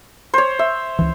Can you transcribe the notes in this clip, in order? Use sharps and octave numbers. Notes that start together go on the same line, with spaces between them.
C5 C#5
E5
C#2 E3